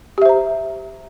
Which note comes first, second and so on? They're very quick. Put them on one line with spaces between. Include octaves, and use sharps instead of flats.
G4 E5 C5 A#5